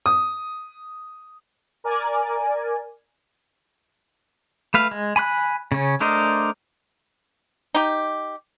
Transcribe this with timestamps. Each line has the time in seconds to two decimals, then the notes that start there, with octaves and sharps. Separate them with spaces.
0.06 D#6
1.84 A#4 D5 G#5
4.74 A3 B4 F5
4.91 G#3
5.16 G#5 B5 C6 F#6
5.72 C#3 C#4
6.00 A3 D4 A#4 C5 D#5
7.75 D#4 G4